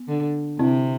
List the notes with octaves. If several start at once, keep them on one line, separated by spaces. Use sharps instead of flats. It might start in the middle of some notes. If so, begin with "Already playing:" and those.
Already playing: B3
D3
C3 C4 E4